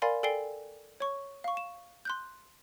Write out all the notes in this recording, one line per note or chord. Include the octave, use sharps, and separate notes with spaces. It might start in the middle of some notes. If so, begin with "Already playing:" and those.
A#4 D5 F5 G#5 B5 C6
A4 D5 G5 G#5 C7 G7
C#5 C#6
F5 C#6
E7
C6 F#6 G6